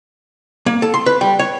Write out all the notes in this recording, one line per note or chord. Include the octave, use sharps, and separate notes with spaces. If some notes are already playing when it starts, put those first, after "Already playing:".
A#3
A4
C6
B4
G3
C#5